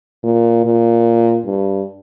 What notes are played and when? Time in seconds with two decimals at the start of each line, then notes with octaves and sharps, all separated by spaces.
0.24 A#2
0.65 A#2
1.46 G2